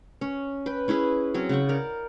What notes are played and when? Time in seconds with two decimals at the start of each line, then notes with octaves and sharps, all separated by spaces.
0.21 C#4
0.66 B4 G5
0.88 C#4 E4 G#4 B4
1.34 F#3 C4 C#4
1.49 C#3 F#5 G5 C#6
1.68 A#4 D5